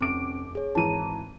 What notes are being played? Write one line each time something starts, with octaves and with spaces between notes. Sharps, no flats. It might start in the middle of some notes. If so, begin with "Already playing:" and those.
F1 C4 C#4 D6 D7
G#4 C#5
G#1 E3 A5 A#5 D#7